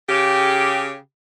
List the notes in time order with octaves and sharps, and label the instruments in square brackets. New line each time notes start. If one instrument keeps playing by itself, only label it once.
[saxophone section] C#3 G4